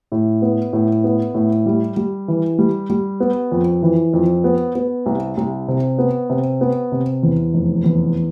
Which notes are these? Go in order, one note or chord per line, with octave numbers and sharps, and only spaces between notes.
A2
B3
A2
B3
A2
G3
G3
E3
G3
G3
B3
F2
E3
F2
B3
B3
C2
C2
C3
B3
C3
B3
C3
E2
F1
E2